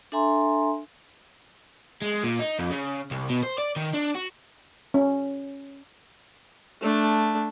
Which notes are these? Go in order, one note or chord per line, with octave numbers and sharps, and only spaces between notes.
D4 A4 E5 G#5 A#5 C6
G#3
A#2
D#4
F2
C#3
C2
B2
C5
D5
D#3
D4
F#4
C#4
A3 D4